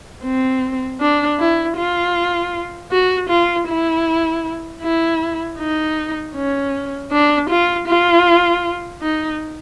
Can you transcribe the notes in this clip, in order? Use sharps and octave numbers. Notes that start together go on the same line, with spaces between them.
C4
D4
E4
F4
F#4
F4
E4
E4
D#4
C#4
D4
F4
F4
D#4